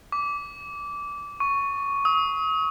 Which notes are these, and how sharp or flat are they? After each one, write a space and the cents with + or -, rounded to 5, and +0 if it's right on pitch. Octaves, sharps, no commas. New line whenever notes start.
D6 -20
C#6 +5
D#6 +40